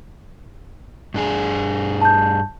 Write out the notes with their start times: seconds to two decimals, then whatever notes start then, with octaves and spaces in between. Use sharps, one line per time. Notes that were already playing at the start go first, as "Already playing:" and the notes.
1.14 G2 D4 G#4
2.02 A5 G6